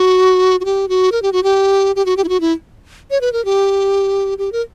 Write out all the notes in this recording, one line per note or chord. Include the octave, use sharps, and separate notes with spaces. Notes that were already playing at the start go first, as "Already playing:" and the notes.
Already playing: F#4
F#4
G4
F#4
A#4
G4
F#4
G4
G4
F#4
G4
E4
F#4
E4
C#5
B4
A#4
G4
G4
A#4